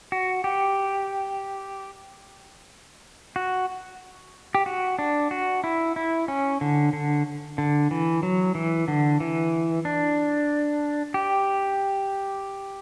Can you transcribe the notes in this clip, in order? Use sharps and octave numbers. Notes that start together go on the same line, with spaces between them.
F#4
G4
F#4
G4
F#4
D4
F#4
E4
E4
C#4
D3
D3
D3
E3
F#3
E3
D3
E3
D4
G4